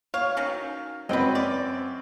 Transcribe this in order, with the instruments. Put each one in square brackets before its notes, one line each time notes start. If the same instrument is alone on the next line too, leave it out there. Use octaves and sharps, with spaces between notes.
[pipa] C#5 [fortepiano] F5
[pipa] D#3 F#3 C#4
[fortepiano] F#2 C4 [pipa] B4 D#5
[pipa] D5